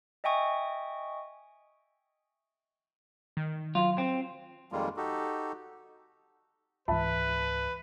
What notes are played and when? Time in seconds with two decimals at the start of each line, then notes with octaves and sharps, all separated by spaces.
0.24 D#5 E5 G5 G#5 C#6 D#6
3.37 D#3
3.75 F#3 F4
3.98 C4
4.72 F2 D#3 G3 G#3 A#3 F4
4.97 D#4 F#4 G4 A4
6.88 C#2 G#2 E3 B4 E5 A5 B5